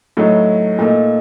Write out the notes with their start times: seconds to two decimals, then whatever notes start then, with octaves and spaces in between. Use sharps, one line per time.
0.17 A2 F#3 A3 D#4
0.79 A#2 A3 D#4